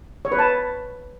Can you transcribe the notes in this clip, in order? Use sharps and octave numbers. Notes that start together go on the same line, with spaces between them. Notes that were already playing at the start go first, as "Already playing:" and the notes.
C#5
B4
A5